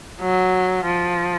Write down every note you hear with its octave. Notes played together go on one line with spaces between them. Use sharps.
F#3
F3